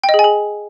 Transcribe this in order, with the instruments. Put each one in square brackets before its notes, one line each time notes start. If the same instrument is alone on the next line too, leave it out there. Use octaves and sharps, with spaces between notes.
[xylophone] G5
D#5
G#4
G#5
G#4